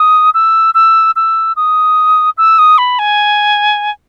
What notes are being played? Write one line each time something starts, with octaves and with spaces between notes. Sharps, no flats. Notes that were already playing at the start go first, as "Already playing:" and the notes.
Already playing: D#6
E6
E6
E6
D#6
E6
D#6
B5
G#5